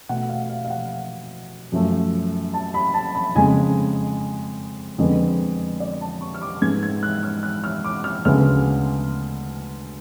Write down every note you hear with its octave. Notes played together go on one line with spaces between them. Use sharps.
B2 A3 F#5
F5
F5
F5
F#5
F#2 F3 A3
A5
B5
A5
B5
F2 C#3 G#3 G#5
F2 D3 G#3 B3
D5
A5
C#6
F6
D6
G#2 G#3 B3 G#6
G#6
F#6
F6
F#6
F6
D6
F6
D2 C#3 G#3 B3 F6